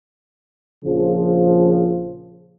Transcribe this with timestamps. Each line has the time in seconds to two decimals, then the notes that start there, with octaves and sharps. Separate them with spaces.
0.84 A#1 C#3 F3